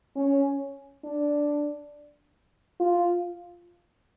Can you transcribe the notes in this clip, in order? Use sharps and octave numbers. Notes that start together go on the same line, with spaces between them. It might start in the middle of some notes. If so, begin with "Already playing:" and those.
C#4
D4
F4